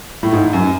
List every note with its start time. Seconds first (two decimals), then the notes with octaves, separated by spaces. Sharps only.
0.23 A2
0.32 G#2
0.53 F#2